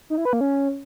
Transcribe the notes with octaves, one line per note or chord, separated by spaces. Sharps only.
D#4
E4
B4
A#3
C#4